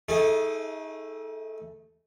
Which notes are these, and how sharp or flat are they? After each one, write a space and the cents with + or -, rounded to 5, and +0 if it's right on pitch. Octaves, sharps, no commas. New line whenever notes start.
A3 +0 D#4 +35 G#4 +0